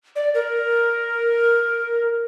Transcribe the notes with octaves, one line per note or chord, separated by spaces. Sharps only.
D5
A#4